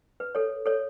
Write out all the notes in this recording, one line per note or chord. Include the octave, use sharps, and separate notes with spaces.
B4
A4 C#5
A4 C#5